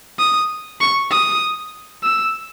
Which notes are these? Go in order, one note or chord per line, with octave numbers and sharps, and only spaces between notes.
D#6
C#6
D#6
E6